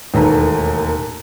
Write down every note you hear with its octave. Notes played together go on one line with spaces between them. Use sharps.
E1 D#2 A2 A4 B4 A#5